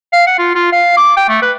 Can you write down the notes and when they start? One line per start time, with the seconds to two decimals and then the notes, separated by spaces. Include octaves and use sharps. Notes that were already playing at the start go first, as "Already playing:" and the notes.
0.12 F5
0.27 F#5
0.38 F4
0.55 F4
0.72 F5
0.97 D6
1.17 G5
1.29 A3
1.42 B4